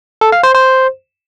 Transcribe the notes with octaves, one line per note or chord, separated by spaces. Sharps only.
A4
F5
C5
C5